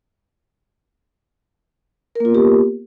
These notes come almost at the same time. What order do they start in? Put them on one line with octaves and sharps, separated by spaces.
A#4 A#3 F4 B3 G4